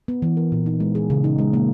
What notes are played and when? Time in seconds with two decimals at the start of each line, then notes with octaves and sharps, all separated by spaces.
0.08 B3
0.22 E3
0.37 A#4
0.52 A#2
0.66 D#4
0.80 G#3
0.95 G#4
1.10 C#3
1.24 D#4
1.39 G#3
1.53 A#3